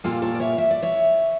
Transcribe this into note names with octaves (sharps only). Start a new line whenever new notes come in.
A#2 G3 A#3 F4 A4
A4 C#5
D5
C#5 E5
E5
D5
C#5 E5